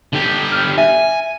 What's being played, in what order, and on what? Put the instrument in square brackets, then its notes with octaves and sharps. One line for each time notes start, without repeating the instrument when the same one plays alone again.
[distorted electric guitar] D3 G4
[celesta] F6
[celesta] E5 [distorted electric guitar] G#5